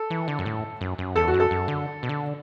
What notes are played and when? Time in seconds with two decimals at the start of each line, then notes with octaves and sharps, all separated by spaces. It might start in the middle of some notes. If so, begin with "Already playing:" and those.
Already playing: A4
0.10 E3
0.28 D3
0.39 F#2
0.46 A2
0.81 F#2
0.98 F#2
1.16 E2 A4
1.28 F#4
1.34 F#2
1.40 A4
1.51 F#2
1.68 D3
2.03 B2
2.09 D3